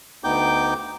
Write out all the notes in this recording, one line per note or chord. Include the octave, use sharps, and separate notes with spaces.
D2 B3 D#4 G5 D6 G6